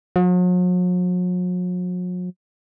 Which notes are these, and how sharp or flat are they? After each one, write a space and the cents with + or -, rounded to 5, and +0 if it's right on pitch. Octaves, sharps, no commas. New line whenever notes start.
F#3 -45